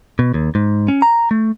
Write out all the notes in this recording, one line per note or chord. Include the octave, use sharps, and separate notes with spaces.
B2
D#2
G#2
C#4
A#5
A3